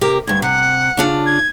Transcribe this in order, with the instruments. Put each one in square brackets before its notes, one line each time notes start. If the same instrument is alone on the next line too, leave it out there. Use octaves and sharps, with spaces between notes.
[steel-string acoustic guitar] C3 G4 A#4
[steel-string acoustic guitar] D2 G2 [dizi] G#6
[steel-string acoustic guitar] C3 [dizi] F#5
[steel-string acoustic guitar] C#3 D4 F4
[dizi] G#6